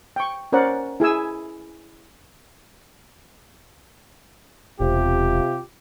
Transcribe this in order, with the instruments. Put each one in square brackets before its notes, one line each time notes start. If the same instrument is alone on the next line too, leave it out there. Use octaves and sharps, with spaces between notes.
[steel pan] G5 C#6
C#4 A#4 C5 D5 F#5
E4 G#4 G#5 E6
[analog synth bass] E1 [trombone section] C3 F4 [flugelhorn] G4